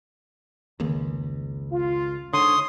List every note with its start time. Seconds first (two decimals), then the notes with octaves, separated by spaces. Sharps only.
0.80 F1 C#2 D#3 A#3
1.72 F4
2.33 G#2 D3 C#5 C6 D#6